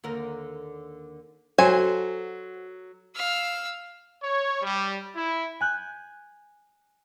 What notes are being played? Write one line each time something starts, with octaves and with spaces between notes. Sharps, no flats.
D#2 D3 A#4
F#3 F#4 A4 C5 G#5
F5 E6
C#5
G3
E4
G#5 F#6 G6